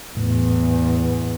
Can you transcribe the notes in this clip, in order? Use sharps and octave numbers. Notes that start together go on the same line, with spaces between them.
E2 A2